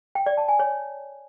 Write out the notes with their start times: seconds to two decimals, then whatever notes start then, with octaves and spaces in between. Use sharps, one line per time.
0.15 G5
0.26 D5
0.37 A5
0.48 G#5
0.59 C#5